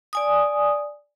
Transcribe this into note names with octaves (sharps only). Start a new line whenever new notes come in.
D5 G#5 D#6